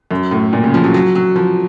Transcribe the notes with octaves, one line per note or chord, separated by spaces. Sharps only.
F#2
A2
A#2
C#3
F3
F#3
F#3
F#3
F3